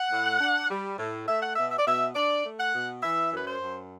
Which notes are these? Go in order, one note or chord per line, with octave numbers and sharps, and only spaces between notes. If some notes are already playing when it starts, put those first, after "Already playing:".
Already playing: F#5
A2
D4
G3
A2
A3 E5
F#5
B2 E5
E5
D5
B2 E5
D4 D5
A3
F#5
B2
E3 E5
F#2
B4
C5
F#2